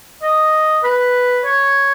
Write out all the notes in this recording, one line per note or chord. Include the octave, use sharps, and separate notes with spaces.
D#5
B4
C#5